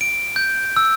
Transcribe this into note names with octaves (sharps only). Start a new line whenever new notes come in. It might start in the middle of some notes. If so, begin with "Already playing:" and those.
D7
G6
E6